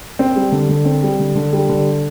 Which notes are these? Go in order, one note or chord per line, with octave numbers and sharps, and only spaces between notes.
C4
G3
D3
D3
C4
G3
D3
D3
G3
D3